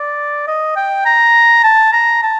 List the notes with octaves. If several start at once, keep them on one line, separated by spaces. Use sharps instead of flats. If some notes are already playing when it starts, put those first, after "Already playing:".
Already playing: D5
D#5
G5
A#5
A5
A#5
A5